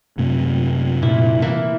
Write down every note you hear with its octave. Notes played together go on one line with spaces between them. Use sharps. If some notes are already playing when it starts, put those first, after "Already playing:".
F#2 C3 A3
A#2 E4
E3 A#3 E4